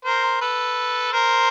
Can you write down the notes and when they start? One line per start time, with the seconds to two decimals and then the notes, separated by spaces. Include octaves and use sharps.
0.05 A#4 C5
0.41 A4 B4
1.12 A#4 C5